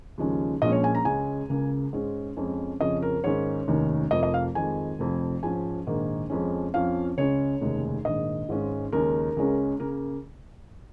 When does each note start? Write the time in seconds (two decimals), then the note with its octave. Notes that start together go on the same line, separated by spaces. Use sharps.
0.18 D#2 C#3 F3 G#3 C#4
0.62 A#1 A#2 F3 G#3 C#4 D#5
0.72 C#5
0.84 G#5
0.95 A#5
1.05 C#2 C#3 G#3 C#4 G#5
1.50 C#2 C#3 A#3
1.93 G#2 G#3 C#4
2.37 F2 F3 G#3 C#4
2.80 F2 C#3 F3 C#4 D#5
3.02 A#4
3.24 G#2 D#3 A#3 C#4 C#5
3.68 F1 D#2 D#3 C#4
4.11 F1 F2 F3 A#3 D#5
4.23 D#5
4.34 F5
4.55 F2 D#3 G#3 G#5
4.99 F1 F2 F3
5.43 G#2 F3 G#3 C#4 G#5
5.87 A#1 G#2 D#3 A#3
6.30 F2 F3 G#3 C#4
6.74 F2 F3 C#4 F5
7.17 C#2 C#3 G#3 C#4 C#5
7.61 F1 D#2 C#3 G#3 C#4
8.05 A#1 G#2 D#3 D#5
8.49 G#1 G#2 G#3 C#4
8.92 D#2 C#3 G#3 C#4 A#4
9.37 C#2 C#3 G#3 C#4
9.80 C#3 A#3 A#4